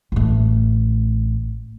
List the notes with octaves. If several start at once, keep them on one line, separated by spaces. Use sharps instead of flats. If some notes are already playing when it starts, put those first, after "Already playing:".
A1 A3